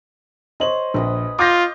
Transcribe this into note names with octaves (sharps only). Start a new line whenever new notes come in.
C5 C#5 D#5 F#7
A#1 B4 D#5 B5
F4 D6 G6 A#6